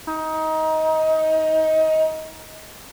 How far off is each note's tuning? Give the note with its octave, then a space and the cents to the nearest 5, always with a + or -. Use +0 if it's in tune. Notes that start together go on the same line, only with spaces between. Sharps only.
D#4 +20